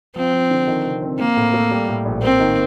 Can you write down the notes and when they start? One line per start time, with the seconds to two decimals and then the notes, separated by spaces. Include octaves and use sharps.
0.16 F3 C4
0.34 F3
0.50 D3
0.67 D#3
0.85 C3
1.02 C4
1.20 A#3 C4
1.37 A2
1.54 A3
1.71 G3
1.89 A2
2.05 A#1
2.23 A#3 C4
2.40 D#3